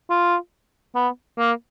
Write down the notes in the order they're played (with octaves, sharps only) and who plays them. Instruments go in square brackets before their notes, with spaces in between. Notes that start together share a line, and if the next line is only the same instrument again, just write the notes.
[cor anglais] F4
B3
A#3